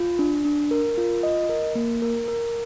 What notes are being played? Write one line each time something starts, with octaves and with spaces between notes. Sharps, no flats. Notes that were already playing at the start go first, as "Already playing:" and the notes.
Already playing: F4
D4
D4
A#4
F4
D#5
A#4
A#3
A#4
A#4